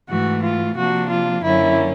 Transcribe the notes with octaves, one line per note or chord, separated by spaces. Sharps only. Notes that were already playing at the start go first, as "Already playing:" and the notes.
G#2 E3 A3 F#4
F4
C3 F3 A#3 D4 F#4
F4
F#2 D3 F#3 A#3 C#4 E4